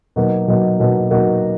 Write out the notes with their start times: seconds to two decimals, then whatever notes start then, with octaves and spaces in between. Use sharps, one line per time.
0.16 B2 F#3 A#3 D#4 F#4
0.48 B2 F#3 A#3 D#4 F#4
0.79 B2 F#3 A#3 D#4 F#4
1.11 B2 F#3 A#3 D#4 F#4